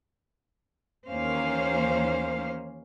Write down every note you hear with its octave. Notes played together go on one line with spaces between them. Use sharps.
D#2 E3 A#3 C#4 C5 F5